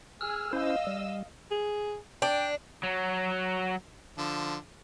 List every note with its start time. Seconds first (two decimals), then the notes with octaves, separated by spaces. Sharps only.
0.21 G#4 E6 F6
0.53 C#4 E4 C5 D#5 F5 E6
0.87 G3
1.51 G#4
2.22 D4 G5
2.83 F#3
4.18 D3 F3